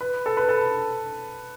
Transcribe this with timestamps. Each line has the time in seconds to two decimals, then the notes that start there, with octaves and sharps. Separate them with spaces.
0.01 B4
0.26 A4
0.37 B4
0.49 A4